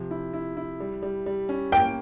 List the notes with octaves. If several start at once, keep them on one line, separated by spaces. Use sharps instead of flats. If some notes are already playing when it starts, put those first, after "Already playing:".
Already playing: C3 F3
E4
E4
E4
G3
G3
G3
C#4
A#3 G5